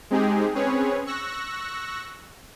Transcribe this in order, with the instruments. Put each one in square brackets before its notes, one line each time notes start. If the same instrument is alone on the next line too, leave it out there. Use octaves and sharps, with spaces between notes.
[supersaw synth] G#3 C4 D#4 G4 G#4
C4 C#4 G#4 B4 C#5
C#6 E6 F#6 A#6